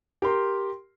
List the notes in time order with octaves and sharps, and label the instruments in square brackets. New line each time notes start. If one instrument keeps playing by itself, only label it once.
[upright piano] G4 A#4 C6